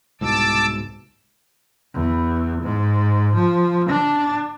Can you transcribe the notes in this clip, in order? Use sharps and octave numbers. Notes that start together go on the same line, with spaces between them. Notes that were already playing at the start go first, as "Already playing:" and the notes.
C2 G#2 B2 A5 D6 E6
E2
G#2
F3
D4